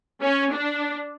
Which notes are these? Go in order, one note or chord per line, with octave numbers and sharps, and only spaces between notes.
C#4
D4